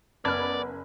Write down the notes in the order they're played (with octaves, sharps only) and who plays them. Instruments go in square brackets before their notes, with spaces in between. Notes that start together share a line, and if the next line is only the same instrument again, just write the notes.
[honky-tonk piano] F#1 B5 G#6 [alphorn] B3 [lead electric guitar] D5 [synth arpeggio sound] A5 F6